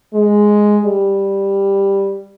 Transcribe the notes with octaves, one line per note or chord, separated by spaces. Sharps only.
G#3
G3